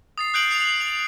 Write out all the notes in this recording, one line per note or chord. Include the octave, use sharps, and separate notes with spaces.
D#6 A6 C7
D#6 F#6 G6 C7 D7 F#7
D#6 C7 F7
F7 F#7